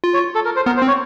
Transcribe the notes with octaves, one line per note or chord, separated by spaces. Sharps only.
F4
C#5
A4
A#4
C5
B3 A#4
C5
C4
C#5